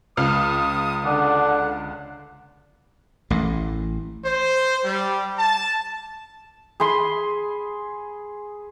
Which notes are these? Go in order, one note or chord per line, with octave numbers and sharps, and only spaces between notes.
C#2 D#6 F6
D3 D4 F#5
A1 A2
C5
G3
A5
G#4 B5 C6